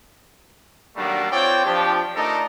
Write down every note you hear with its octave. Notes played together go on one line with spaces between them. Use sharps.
D#3 F#3 G3 A3 A#3 D4
C4 F4 C#5 D5 G5
F3 D4 G4
A3 D4 D#4 A4 A#4 D#5